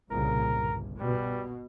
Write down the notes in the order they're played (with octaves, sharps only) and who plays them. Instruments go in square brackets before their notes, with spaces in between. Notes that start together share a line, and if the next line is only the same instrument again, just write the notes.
[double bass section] C2 A#2 C#3 [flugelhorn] A#4
[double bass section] G1
[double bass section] B2 [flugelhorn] G3